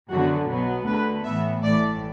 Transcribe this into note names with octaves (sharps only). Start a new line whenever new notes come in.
F#2 D3 B3 F#4
B1 B2 F#3 B3
D2 D3 A3 B4
A2 E3 B3 E5
A1 A2 E3 A3 D5